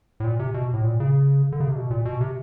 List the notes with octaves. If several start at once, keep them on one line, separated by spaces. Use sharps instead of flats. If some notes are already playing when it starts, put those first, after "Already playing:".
A2
A#2
C3
B2
A2
A#2
C#3
D3
C#3
C3
B2
A#2
B2
C3